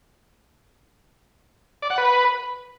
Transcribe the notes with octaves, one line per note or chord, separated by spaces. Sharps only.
D5
F#5
B4